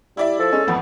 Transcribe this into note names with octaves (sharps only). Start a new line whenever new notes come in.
G3 E4 D5 E5
F3 A4
G#3 C#4
A1 F2 A2 B3